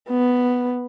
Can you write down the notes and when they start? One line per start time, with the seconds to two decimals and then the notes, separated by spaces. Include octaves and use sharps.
0.09 B3